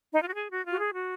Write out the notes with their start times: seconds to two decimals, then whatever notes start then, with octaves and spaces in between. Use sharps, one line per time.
0.13 D#4
0.21 F4
0.27 F#4
0.36 G#4
0.50 F#4
0.65 F4
0.72 F#4
0.78 G#4
0.93 F#4